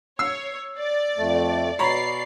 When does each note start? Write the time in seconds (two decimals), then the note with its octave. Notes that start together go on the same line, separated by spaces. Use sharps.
0.19 C#5 E6 C7
0.78 D5
1.18 F2 A3
1.79 B2 C#5 D5 A#5 B5 C7